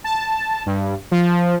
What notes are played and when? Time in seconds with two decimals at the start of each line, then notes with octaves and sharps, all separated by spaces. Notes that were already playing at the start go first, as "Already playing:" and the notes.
0.04 A5
0.66 G2
1.11 F3